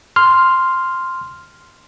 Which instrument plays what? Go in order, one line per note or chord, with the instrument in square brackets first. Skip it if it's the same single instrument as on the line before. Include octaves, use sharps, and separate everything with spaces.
[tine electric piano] C6 F6